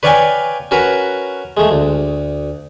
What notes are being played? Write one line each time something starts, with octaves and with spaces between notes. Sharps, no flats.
B4 C#5 D5 F5 G5 G#5
C#4 F#4 A#4 B4 A#5
G#3 A3
D2